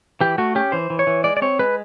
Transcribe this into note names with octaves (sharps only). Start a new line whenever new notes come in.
E3 G4
A3 F#4
C#4 G4
E3 C5
E3
C#5
E3
G#3 D5
D5
C4 C#5
G#3 B4